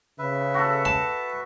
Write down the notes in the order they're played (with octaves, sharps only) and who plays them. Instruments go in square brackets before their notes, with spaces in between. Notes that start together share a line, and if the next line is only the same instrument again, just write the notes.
[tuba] C#3 [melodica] B4 E5
[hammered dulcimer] F#4 A4
[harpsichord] A5